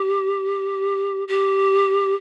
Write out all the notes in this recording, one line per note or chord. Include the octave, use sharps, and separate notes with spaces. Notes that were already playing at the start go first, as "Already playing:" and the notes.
Already playing: G4
G4